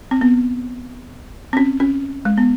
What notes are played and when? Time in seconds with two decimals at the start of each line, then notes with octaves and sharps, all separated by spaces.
0.11 C4
0.21 B3
1.53 C4
1.57 C#4
1.80 C#4
2.25 G#3
2.38 B3